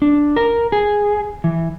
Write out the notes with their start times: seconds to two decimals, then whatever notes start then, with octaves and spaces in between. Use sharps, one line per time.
0.02 D4
0.36 A#4
0.72 G#4
1.44 E3